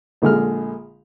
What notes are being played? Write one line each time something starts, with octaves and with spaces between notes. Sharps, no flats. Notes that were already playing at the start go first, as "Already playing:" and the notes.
A#1 D3 G#3 F6